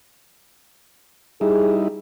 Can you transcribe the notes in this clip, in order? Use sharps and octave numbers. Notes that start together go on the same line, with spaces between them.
G3 D#4 E4 G#4